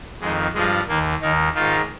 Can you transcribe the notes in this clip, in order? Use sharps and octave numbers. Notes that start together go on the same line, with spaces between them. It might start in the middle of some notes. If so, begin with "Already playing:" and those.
F2 D#3 G#3
G2 F3 G#3
D#2 D#3 A#3
D#2 D#3 D#4
G#2 D#3 F4